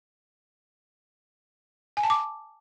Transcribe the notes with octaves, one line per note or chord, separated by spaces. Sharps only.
G#5
A5
D6